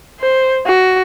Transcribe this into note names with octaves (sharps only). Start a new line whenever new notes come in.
C5
F#4